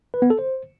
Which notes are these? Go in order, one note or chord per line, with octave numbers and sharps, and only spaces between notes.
B4
B3
A4
C5